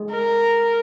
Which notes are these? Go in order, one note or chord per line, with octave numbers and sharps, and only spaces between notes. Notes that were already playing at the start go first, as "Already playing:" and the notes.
Already playing: G#3
A#4